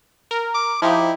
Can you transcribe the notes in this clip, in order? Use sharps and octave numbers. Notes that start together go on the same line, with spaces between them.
A#4
D6
F3 D#4 E4 G4